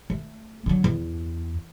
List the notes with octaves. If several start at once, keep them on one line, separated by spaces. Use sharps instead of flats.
A3
D3 F#3
E2